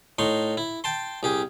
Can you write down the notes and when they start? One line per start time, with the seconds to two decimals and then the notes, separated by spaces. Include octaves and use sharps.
0.19 A2 D#4 C6 C#6
0.57 E4
0.84 G5 A5 C6
1.23 C2 G4 G#4